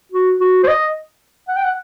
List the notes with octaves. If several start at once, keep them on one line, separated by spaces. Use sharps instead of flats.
F#4
F#4
C5
D#5
F#5
G5
F#5